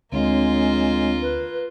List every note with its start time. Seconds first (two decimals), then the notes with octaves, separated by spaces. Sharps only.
0.12 D2 G#3 A#3 C4 D4 F4 C#5
1.22 B4